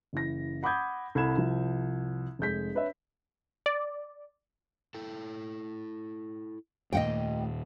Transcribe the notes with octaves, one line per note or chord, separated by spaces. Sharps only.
F#1 E3 A#6
F#5 B5 D6 D#6 G6 G#6
C2 A4 B5 G#6 E7
C2 F3
F1 G#3 G6 B6
D4 B4 C#5 E5
D5
E4 A4 G5
D#2 A#2 A3 F4 D#5 F#5 G5